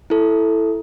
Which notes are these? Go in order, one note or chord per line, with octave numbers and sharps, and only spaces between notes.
E4 A4